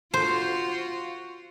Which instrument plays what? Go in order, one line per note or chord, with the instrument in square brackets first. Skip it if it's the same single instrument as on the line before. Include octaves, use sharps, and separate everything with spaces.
[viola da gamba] F4 F#4 [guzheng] C5